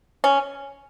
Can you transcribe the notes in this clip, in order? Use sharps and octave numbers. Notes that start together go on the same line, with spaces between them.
C#4